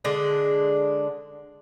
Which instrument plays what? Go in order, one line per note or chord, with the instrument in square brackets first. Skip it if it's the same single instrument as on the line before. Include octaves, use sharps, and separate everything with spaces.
[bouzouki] D3 G#3 D4